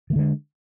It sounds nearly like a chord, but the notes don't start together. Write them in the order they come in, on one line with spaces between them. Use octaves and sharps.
D#3 A3 D3 G#3